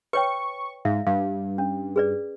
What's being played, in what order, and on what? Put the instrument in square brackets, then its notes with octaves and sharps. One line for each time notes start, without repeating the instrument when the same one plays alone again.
[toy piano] B4 C#5 G5 [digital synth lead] C#6
[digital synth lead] G#2 [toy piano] E5 F5
[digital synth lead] G2 [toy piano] F5
[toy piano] C#4
G#4 B4 D5